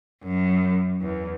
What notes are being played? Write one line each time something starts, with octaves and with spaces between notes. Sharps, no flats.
F#2
E2